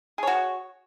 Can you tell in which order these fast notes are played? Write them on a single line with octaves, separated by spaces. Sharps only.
G#4 C#5 F#4